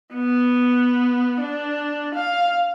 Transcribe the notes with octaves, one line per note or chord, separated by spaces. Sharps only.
B3
D4
F5